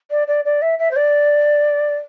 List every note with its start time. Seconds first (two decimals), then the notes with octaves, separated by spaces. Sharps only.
0.11 D5
0.28 D5
0.45 D5
0.62 E5
0.79 E5
0.91 C5
0.96 D5